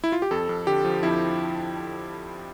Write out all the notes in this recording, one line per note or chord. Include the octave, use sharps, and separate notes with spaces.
E4
F4
G4
F2 A4
F2
D3 G4
F3
F2 E4